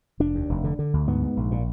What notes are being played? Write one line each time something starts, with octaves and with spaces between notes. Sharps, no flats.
F1 D4
D#2
F1
D3
D3
D2
G#2 B3
G#2
A#1
A#2